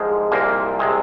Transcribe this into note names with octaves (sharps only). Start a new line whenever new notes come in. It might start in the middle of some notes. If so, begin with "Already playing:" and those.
Already playing: C2 G#2 F3 G#3
C2 A#2 A#3
C3 G#3